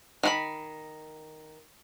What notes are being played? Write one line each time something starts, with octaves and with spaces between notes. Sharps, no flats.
D#3 F#4 B5